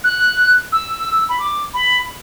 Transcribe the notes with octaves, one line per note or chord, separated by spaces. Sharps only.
F#6
E6
B5
D6
B5